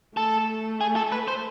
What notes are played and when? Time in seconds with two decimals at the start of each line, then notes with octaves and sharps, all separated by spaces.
0.17 A3 A4
0.81 G#4
0.96 A4
1.12 B4
1.28 C5